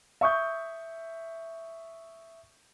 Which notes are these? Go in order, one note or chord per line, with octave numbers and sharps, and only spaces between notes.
E5 C#6 D#6 G6